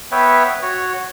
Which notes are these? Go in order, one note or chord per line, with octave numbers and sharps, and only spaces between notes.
B3 B4 C#5 E5 G5
F#4 C#5